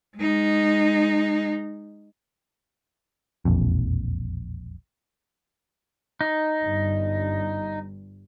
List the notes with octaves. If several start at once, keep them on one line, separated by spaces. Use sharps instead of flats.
G#3 D#4
E1 A#1 F2
D#4
G1 G2